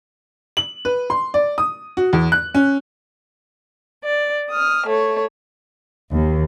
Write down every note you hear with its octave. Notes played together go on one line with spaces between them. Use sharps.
F#7
B4
C6
D5
D#6
F#4
E2
F#6
C#4
D5
D#6 F6
A3 C#5
D#2